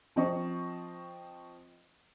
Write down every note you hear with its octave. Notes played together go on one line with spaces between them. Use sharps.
F3 C4 D#5 C#6